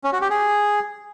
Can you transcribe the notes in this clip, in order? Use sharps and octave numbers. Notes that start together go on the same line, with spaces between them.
C#4
F#4
G4
G#4